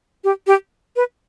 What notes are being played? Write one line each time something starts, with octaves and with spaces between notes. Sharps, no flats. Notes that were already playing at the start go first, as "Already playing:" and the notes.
G4
G4
B4